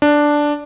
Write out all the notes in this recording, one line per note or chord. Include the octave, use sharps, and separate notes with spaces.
D4